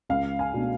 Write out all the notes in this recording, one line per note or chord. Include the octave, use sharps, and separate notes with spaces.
C#2 F5
G#5
B2 A3 D4